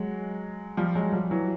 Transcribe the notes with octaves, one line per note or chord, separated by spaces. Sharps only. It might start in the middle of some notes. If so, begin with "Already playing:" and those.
Already playing: F#3 G#3
F3 G3
F#3 G#3
F3 G3
E3 F#3